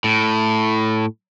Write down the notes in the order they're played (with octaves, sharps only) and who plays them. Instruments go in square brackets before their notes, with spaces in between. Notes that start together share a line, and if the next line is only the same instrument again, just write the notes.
[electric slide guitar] A2